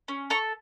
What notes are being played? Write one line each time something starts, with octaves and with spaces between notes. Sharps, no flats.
C#4
A4 A#5 C#6